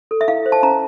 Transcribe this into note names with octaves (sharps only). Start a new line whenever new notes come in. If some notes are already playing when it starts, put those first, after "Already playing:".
A4
E5
E4 F5
C5
A5
C#4 A#5